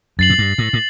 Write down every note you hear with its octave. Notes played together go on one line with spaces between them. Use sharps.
F#2 A6 C7 F#7
A2
G2
A2
A2